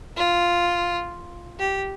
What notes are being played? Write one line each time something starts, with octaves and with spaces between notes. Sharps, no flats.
F4
G4